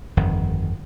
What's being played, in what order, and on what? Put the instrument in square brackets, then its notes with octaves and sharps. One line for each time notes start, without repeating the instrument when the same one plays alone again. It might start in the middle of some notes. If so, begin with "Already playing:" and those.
[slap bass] G1 F2 D#3